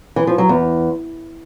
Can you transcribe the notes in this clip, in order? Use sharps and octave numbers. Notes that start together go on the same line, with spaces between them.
E3
F3
F#3
E2